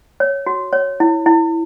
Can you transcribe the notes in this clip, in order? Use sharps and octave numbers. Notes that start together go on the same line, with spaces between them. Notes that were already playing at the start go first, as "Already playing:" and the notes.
C#5
F#4
C#5
E4
E4